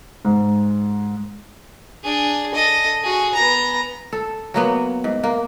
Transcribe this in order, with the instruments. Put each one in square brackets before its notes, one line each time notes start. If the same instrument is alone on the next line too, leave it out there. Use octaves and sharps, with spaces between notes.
[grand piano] G#2
[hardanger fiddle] D4 G#4
A4 D#5
F#4 G#4
B3 A#5
[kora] A4
F#3 A#3 B3
G#2
A#3